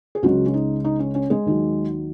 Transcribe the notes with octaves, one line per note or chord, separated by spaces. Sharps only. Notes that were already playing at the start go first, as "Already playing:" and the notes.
G#4
C#2 C#3 F#3 G#3 F#4
C#4
D#4
D#4
C#4
C#4
G#3 G#4
D#2 D#3 F#3